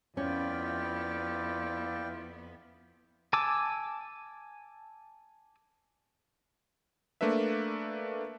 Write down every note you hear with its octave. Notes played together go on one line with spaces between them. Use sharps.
F2 B3 C#4 E4 F4 D5 G5
G#5 A5 D6 E6
A3 A#3 D4 B4 E5